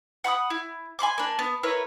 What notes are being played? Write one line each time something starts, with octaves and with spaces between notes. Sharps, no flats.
F#5 B5 D6 D#6
E4
G#5 B5 C6 D6
A#3 D4
B3
E4 A#4 B4 C#5